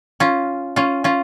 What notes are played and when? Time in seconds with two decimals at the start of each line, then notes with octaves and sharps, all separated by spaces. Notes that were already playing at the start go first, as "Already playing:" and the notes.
0.20 C#4 F4
0.76 C#4 F4
1.04 C#4 F4